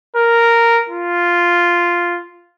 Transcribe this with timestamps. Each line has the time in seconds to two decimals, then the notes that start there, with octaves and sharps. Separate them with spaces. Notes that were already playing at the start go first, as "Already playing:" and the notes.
0.16 A#4
0.89 F4